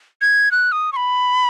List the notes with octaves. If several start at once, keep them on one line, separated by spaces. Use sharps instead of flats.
G#6
F#6
D#6
C#6
B5